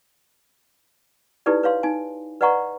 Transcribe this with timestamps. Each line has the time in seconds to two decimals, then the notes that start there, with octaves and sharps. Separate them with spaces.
1.46 D#4 E4 G4 A4 B4 D5
1.63 B4 C#5 F5 C6
1.83 D#4 G#5
2.41 B4 D5 D#5 F#5 A#5 C#6